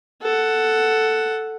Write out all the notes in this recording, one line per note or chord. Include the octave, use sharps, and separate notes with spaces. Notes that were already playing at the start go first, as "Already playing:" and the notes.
A4 F#5